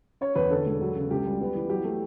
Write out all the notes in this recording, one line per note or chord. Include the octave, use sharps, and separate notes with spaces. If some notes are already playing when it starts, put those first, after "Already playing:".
C#4 C#5
E2 B4
D3 A4
E1
F#3
C#3
C#2 G4
G3
B3
E3
F#3 G4
A3